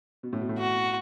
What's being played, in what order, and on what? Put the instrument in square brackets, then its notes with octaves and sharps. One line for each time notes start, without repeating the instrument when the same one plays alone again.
[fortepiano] B2
A2
B2
A2
[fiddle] F#4